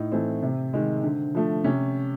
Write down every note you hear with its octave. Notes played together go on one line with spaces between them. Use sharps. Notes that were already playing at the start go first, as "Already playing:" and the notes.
Already playing: A2 D#4
E3 A3 C4
C3
D#3 G#3
D3
F3 A3
C3 C#4